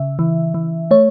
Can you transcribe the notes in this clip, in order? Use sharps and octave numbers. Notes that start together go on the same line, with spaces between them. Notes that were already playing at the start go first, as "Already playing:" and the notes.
Already playing: C#3 E5
E3
E3
A3 C#5